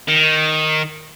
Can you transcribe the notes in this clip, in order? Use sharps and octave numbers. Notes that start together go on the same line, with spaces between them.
D#3